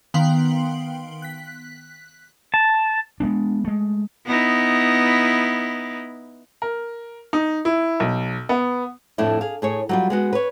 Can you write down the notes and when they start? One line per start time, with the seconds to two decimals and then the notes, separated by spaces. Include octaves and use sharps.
0.14 D#3 B3 F5 G5 C6 F#7
1.22 F#6 B6
2.54 A5
3.20 G#3 A3 B3 D4
3.65 G#3 A3
4.26 B3 D#4 E4
6.62 A#4
7.33 D#4
7.65 E4
8.00 B1
8.49 B3
9.18 F2 A2 A3 D4 E4
9.41 G#4 F5
9.62 A2 G#4 C#5
9.89 F#3 G3 F4
10.10 G#3 B3 F#4
10.33 B4 C#5